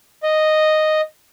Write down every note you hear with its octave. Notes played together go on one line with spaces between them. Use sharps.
D#5